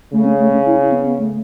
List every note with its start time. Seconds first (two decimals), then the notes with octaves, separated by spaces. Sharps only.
0.12 C#3 A3
0.25 C#4
0.39 A3
0.53 C#4
0.66 E4
0.80 C#4
0.92 B3
1.05 B3
1.19 A3